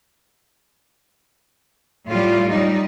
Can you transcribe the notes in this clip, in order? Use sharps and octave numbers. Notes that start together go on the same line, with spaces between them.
A2 G3 F4
G3 D#4